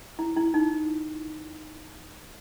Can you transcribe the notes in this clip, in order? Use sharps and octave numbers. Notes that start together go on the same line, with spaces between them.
E4
E4
D#4